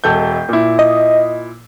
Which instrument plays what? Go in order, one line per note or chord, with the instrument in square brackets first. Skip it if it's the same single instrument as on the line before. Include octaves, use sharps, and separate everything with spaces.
[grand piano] E1 A4 G6
A#2 E4
[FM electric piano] D#5